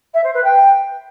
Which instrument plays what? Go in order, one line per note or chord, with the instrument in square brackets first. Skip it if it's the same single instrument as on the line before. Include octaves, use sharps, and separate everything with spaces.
[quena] E5
C5
B4
G5